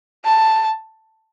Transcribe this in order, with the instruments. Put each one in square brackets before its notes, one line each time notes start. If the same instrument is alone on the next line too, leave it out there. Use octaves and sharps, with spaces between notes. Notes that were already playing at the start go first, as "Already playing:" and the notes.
[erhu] A5